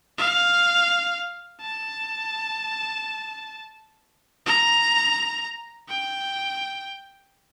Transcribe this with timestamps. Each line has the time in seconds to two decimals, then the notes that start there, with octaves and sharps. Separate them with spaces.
0.18 F5
1.61 A5
4.46 A#5
5.89 G5